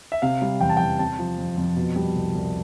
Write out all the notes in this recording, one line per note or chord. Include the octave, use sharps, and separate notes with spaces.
E5
C3 F5
G3
E2 G5
A5
E2 G5
C3 A5
F3
F2
F2
B2
G3
C2
C2